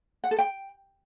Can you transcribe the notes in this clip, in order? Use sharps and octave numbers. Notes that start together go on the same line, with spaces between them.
F#5
A4
G5